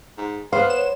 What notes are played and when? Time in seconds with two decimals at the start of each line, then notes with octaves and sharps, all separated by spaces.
0.18 G#2
0.53 B3 C5 F5
0.70 C#5 E7